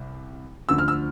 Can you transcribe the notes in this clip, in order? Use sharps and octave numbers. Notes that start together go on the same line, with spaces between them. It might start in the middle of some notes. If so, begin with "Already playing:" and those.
Already playing: C2 C3
D2 D3 F3 E6
F6
E6